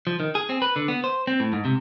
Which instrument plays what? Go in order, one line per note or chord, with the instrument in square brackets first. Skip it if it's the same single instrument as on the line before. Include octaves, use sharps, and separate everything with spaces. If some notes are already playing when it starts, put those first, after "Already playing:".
[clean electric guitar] F3
D#3
G#4
C4
B4
D3
B3
C5
C4
A2
G#2
C3